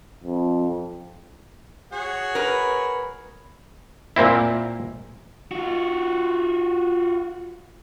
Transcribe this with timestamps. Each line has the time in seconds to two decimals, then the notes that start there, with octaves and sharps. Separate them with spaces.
0.23 F2
1.92 F#4 G#4 C#5
2.35 A#4 B4
4.16 A#2 A#3 C4 E4
5.51 F4 F#4